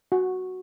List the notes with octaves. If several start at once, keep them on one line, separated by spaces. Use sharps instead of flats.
F#4